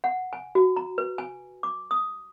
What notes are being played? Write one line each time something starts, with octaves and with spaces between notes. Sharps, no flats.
F#5
G#5
F#4
A#5
B4
G#5
D6
D#6